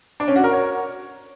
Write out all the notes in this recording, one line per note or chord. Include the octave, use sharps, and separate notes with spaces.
D4
C#4
F#4
A#4
C#5